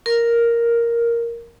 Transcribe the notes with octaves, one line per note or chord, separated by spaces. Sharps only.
A#4